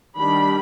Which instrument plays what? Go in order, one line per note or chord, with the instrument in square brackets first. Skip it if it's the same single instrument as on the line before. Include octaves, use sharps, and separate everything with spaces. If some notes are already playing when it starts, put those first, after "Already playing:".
[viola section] D#3 G3 D4 B5